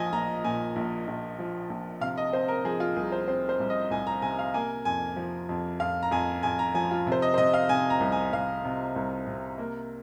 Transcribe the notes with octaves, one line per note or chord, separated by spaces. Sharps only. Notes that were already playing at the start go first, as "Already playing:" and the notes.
Already playing: A#1 F3 D#5 G#5
A#1 A#5
A#2 G#5
A#1
A#1
F3
A#1
C3 F5
D#5
C4 C5
A#4
F3 G#4
F4
C2 G#4
C5
C4 C5
C5
C2
D#5
C2 G#5
A#5
C3 G#5
F5
A#3 G#5
F2 G#5
F3
F2
F2 F5
A#5
F2 G#5
F2 G#5
A#5
F3 G#5
F4
C3
C5
D#5
C5
C3 D#5
F5
C3 G#5
A#5
C2
G#5
C2 F5
C3
C2
C3
A#3